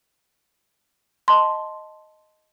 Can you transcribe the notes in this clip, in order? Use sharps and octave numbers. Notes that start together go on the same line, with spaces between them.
D#5 A5 C6